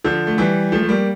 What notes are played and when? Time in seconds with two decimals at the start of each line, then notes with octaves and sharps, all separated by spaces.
0.04 D3 F3
0.27 A3
0.38 E3 G3
0.72 F3 A3
0.83 A3
0.89 G3 A#3